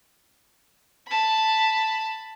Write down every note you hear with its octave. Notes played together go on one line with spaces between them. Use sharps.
A5 B5